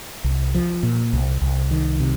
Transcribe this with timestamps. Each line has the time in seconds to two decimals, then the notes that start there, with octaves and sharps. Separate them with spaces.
0.24 C2
0.54 F3
0.83 A#2
1.13 C2
1.42 C2
1.71 D#3
2.00 C3